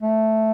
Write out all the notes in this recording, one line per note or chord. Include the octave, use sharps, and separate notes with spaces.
A3